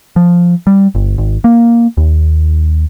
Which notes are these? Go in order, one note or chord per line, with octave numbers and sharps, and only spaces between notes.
F3
G3
G1
G#1
A#3
D#2